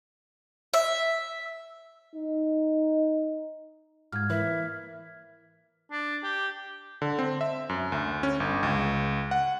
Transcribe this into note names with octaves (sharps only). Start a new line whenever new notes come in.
E5
D#4
G#2 F4 F6 G#6
E3 A#3 E4 B4 E5
D4
G4
D3
C4
E5
F#2
D2
C#4
G1
C#2
F#5